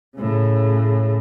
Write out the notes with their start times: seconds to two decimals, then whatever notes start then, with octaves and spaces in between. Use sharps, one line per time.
0.17 A2 C#3